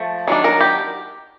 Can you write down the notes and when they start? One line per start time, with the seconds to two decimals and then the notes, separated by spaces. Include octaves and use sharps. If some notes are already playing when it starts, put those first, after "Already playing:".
Already playing: F3 A3
0.28 D#3 F#3 D4
0.44 A#4
0.60 G4